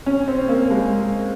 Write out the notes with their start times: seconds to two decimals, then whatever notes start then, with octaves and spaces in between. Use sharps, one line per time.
0.06 C#4
0.28 C4
0.49 A#3
0.70 G#3